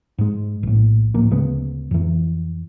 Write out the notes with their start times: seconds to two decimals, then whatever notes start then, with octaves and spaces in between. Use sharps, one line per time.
0.18 G#2 G#3
0.63 A#1 A2
1.14 D1 A2 F3 A#3
1.31 D2 C#3 G#3 B3
1.91 F2 E3